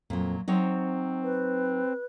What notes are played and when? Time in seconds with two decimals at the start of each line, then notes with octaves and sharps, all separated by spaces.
0.10 F2 A#2 F#3
0.48 F#3 C4 D#4 C#5
1.23 B4